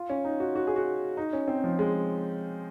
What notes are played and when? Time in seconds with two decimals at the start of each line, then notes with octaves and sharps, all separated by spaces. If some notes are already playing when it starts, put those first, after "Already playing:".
Already playing: F4
0.09 C#4
0.25 D#4
0.40 F#4
0.55 F#4
0.67 G#4
0.76 F#4
1.17 D#4
1.33 C#4
1.48 C4
1.64 F3
1.79 G#3